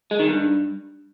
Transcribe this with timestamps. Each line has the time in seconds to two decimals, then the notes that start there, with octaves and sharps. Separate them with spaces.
0.11 G#3
0.19 D#3
0.28 G2